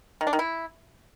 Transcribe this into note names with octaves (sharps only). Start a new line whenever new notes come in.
D#3
D4
D#3
E4